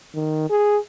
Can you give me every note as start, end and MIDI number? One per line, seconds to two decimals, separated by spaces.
0.15 0.48 51
0.50 0.77 68